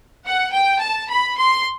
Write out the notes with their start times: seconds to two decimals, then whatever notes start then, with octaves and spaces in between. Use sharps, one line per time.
0.24 F#5
0.52 G5
0.80 A5
1.09 B5
1.37 C6